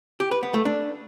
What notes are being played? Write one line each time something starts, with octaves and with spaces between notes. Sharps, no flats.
G4
B4
B3
A3
D4